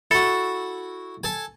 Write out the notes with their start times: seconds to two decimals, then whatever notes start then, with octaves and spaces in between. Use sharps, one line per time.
0.11 E4 F#4 A4
1.24 A4 G#5